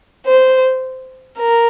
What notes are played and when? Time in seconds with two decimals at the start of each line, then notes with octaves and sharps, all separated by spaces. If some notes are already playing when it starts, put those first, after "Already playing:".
0.26 C5
1.39 A#4